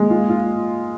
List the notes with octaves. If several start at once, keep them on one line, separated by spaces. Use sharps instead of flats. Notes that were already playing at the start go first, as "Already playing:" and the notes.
Already playing: G#3 A#3
F4
F4